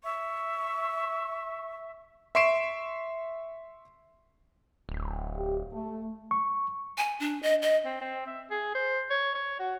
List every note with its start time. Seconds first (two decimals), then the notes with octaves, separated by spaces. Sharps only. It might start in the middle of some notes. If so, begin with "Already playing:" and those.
0.04 E5 C#6
2.35 E5 C6 C#6 C7 D7 E7
4.89 D1
5.35 G4
5.72 A3
6.31 C#6
6.98 G#5
7.20 D4
7.43 D#5
7.62 D#5
7.85 C4
8.01 C4
8.27 E5
8.50 G#4
8.75 C5
9.10 C#5
9.35 C#5
9.59 F#4